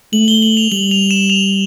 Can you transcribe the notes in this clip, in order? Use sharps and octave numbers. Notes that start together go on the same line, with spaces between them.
A3 F#7
G7
F#7
F7
G3 F#7
F7
E7
F7